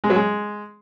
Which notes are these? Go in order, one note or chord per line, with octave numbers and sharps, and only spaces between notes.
G#3
F#3
G#3